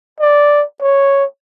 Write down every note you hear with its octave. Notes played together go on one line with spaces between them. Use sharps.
D5
C#5